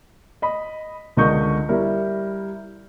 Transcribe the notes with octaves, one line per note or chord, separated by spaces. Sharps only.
D#5 B5
C#2 D3 A#4 D#5 C#6 G6
G3 E4 A#4